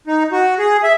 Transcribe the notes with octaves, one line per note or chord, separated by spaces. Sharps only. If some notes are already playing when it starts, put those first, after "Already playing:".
D#4
F#4
G#4
E5